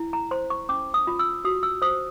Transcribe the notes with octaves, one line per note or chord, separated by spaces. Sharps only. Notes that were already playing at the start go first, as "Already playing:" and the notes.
Already playing: E4
A#5
C5 C6
C#6
C#4 D6
D#6
F4
E6
F#4 D#6
E6
C5 D#6